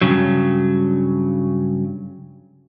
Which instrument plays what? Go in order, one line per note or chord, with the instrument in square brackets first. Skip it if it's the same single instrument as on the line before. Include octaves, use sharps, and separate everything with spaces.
[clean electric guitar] G2 C#3 F#3